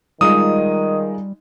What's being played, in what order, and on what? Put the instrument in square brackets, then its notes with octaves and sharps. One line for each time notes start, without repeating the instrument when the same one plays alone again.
[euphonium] D#3 [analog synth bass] G3 [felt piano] G#3 D#4 F4 [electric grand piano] D#6